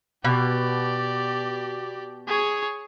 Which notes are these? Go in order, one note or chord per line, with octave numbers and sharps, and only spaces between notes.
B2 G4 D5
G#4 C#5